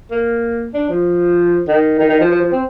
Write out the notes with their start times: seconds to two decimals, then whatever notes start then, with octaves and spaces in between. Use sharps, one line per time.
0.11 A#3
0.74 D4
0.89 F3
1.68 D#3
1.99 D#3
2.09 D#3
2.20 F3
2.30 F3
2.41 F3
2.52 C4